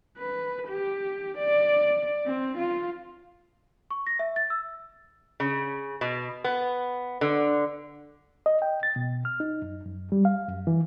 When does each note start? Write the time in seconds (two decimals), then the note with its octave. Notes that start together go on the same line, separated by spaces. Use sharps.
0.18 B4
0.68 G4
1.39 D5
2.26 C4
2.58 F4
3.91 C#6
4.07 A#6
4.19 E5
4.36 A6
4.50 E6
5.40 C#3
6.01 B2
6.44 B3
7.21 D3
8.46 D#5
8.62 G5
8.83 A6
8.96 B2
9.25 F6
9.40 D#4
9.62 F#2
9.86 F#2
10.12 G3
10.25 F5
10.49 F#2
10.67 E3